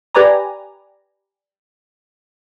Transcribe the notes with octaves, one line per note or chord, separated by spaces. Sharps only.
G4 B4 D5 G#5 A#5